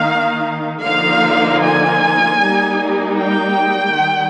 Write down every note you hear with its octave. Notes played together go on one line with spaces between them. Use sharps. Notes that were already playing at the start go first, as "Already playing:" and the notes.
Already playing: D#3 A#3 D#4 F5
D3 F3 A#3 D#4 F5
G#5
G3 A#3 D#4
G5
D#3 G3